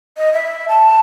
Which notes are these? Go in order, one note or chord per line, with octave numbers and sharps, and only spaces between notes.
D#5
E5
A5